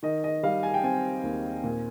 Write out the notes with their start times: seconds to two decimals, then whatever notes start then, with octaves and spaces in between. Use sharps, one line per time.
0.03 D#3 D#5
0.24 D#5
0.43 G3 F5
0.63 G#5
0.74 G5
0.83 C4 G#5
1.23 D#2
1.64 A#2